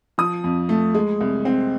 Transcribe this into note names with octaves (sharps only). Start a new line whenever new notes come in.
F3 D#6
F2
A3
G#3
C2
C4